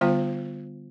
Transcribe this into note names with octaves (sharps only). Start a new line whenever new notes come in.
D3 G3 B3 F4 C5 G5